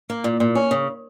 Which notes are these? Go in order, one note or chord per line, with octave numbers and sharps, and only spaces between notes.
A#3
A#2
A#2
C#4
C#3